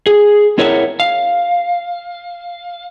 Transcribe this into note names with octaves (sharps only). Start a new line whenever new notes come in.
G#4
C4 E4 A#4 C#5 E5 F#5
F5